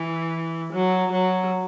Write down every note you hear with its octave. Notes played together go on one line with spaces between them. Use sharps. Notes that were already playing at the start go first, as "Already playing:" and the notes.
Already playing: E3
F#3
F#3